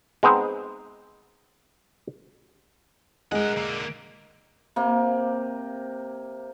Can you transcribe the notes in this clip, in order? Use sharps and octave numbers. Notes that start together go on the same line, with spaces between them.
G#3 B3 C4 D#4 C5
G#3 A#4 F#5
D3 A#3
C3 A#3